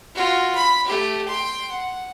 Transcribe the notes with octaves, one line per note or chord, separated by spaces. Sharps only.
F4 F#4
B5
A3 G4
G5 C6
F#5